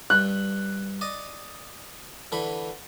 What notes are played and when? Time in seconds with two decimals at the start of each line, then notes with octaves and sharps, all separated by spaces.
0.10 G2 F#6
1.01 D5 D#5
2.32 D3 E3 B5